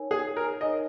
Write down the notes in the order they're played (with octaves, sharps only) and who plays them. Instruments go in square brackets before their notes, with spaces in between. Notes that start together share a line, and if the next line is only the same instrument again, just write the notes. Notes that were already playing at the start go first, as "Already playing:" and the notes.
Already playing: [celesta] D#4 A#4 C#5 G#5
[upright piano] G#4
A#4
[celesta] D#4 A#4 C#5 G#5 [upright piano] D#5